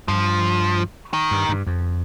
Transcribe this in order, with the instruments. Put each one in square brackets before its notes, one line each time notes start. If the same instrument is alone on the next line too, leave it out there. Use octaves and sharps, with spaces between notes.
[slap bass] G2 [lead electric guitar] F3
[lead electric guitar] D#3
[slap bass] G2
G2
F2